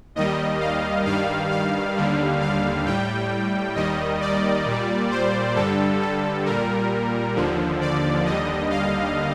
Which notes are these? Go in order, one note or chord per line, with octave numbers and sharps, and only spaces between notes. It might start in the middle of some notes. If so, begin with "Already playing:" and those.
D#2 D#3 G3 D#5
F5
G2 D#3 G3 F5
F5
D#2 D3 G3
F5
A2 G3 G5
D#2 D#3 G3 D#5
D5
A#2 G3
C5
G2 D3 G3 A4
A4
A#2 G3 A#4
D#2 D3 F3
D5
D#2 D3 G3 D#5
F5